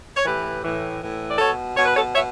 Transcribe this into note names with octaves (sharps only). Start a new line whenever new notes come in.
C#5
A2 E3 G4 B4
A2 E3
A2 E3
D5
B2 A4 C#5
B2 C#5
B4
A4 C#5
B2 C#5 E5